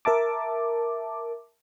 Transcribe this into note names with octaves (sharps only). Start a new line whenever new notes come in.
A#4 E5 A5 D6